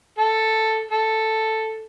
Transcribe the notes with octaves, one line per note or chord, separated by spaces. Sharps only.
A4
A4